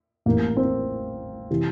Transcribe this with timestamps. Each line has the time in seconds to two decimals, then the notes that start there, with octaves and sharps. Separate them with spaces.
0.26 A1 A2 E3 G3 A#3
0.57 C4
1.50 C3 E3 G3